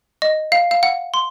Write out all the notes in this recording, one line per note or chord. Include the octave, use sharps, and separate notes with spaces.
D#5
F5
F5
F#5
C6